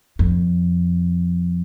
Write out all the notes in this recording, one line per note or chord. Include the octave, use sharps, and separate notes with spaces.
F2